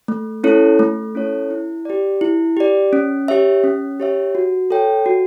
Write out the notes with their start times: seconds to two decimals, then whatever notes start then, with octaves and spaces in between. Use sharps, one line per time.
0.08 A3
0.44 C#4 E4 A4 C#5
0.79 A3
1.15 C#4 E4 A4 C#5
1.51 E4
1.85 G4 D5
2.21 E4
2.57 G4 D5
2.93 C#4
3.28 G4 C#5 E5
3.64 C#4
4.00 G4 C#5 E5
4.35 F#4
4.70 A4 C#5 G5
5.06 F#4